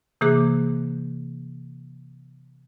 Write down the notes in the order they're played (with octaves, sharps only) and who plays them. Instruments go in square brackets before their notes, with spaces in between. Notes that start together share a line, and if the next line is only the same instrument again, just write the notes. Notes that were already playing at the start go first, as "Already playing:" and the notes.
[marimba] C3 E3 A#3 G#4 D6 F#6